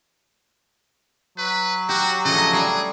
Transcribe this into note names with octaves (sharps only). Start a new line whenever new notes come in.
F#3 B4
F#4 G4
C#3 F3 A3 D#5
G3 G#4